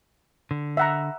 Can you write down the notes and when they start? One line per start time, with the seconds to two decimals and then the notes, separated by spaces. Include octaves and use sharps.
0.51 D3
0.77 E5 F#5 A#5